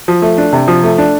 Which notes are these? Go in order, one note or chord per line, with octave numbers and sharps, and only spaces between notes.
F3
A3
D4
C3
F3
A3
D4